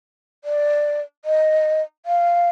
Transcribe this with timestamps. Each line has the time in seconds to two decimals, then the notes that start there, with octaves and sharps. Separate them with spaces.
0.44 D5
1.25 D#5
2.06 F5